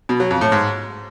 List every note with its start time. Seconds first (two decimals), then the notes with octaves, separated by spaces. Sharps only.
0.09 B2
0.20 F#3
0.31 F2
0.41 A2
0.52 G#2